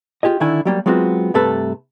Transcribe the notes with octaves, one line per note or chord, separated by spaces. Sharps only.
F4 G4 G#4 D#5
D3 D#3 D4 E4 G#5
F#3 G3 A#3
F#3 G#3 B3 C4 F4 F#4
G2 C3 A3 A4 B4